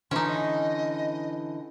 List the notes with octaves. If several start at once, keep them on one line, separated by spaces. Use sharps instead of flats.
D3 E3 C#4 D#4 C6
D#5